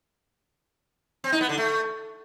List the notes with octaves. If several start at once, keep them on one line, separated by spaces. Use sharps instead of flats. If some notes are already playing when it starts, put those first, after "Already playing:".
C4
D#4
B3
D3
A3